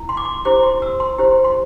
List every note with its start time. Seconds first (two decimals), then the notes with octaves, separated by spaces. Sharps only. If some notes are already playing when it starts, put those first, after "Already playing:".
Already playing: E4
0.09 C6
0.17 D6
0.25 C6
0.45 E4 G4 C5 D6
0.63 C6
0.82 E6
1.00 C6
1.18 E4 G4 C5
1.44 C6